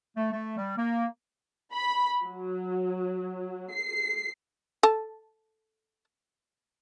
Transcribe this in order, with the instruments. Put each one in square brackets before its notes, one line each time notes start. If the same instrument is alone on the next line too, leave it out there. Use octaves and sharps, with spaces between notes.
[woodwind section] A3
A3
G3
A#3
[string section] B5
F#3
C7
[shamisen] A4 A5